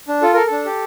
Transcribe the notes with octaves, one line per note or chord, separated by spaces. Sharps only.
D4
F4 A4
A4 A#4
D4 A4
G4